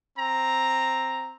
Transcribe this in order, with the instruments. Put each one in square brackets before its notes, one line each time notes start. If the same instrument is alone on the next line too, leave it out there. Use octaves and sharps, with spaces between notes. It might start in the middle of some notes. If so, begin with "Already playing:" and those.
[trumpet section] C4 A#5